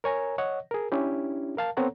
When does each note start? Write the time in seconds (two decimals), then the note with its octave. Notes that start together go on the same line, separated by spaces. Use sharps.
0.04 A#4 C#5 G#5 A#5
0.38 C#5 D#5 F#5
0.71 G#4 A#4
0.92 C#4 D4 E4 G4
1.57 A#4 F5 A5
1.77 B3 C4 A4 C#5 F#5 A#5